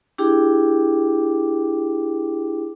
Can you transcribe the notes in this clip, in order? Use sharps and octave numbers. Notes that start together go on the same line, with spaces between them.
D4 E4 G4 G#4 G5 D6